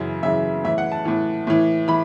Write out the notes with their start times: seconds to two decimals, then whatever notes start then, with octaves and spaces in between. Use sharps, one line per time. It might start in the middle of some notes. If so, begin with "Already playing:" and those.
Already playing: F#2 C#3 E3
0.23 F#2 C#3 E3 E5
0.64 A2 E3 E5
0.78 F#5
0.92 A5
1.05 A2 E3
1.47 A2 E3
1.88 E3 B5